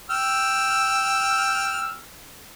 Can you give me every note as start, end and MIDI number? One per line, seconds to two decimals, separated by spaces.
0.10 1.97 79
0.10 1.97 88
0.10 1.97 89